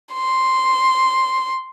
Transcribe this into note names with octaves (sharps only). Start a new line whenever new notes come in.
C6